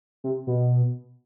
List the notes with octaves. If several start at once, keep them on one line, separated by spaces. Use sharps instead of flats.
C3
B2